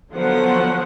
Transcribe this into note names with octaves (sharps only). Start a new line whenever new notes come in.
D3 F3 F#3 B3 C5 F#5